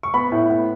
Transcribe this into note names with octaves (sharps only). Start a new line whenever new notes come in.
C#6
B3 B5
A2
B3